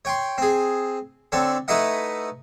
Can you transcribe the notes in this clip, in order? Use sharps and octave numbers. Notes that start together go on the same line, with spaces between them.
C#5 G5 C6
C4 G#4
D3 C4 A4 C#5
A3 D#4 E4 B4 D#5 F#5